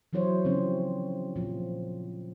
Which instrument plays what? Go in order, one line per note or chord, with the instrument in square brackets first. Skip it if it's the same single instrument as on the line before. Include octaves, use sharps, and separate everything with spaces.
[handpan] E3 F#3 E4 C5 C#5
C#3 F3 F#3 C4 C#4
A#2 F3